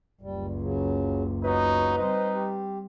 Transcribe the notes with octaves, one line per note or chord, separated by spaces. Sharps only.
F#1 C#2 G3
C#3 F#3
B3 D#4 F#4 B4 C#5
G3 C4 D#4 C5 D#5
G4